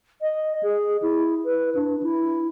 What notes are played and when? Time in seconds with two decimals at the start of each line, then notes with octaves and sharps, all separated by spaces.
0.22 D#5
0.63 G#4
1.02 E4
1.45 B4
1.75 D4
2.03 E4